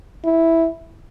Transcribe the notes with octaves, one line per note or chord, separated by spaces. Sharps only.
E4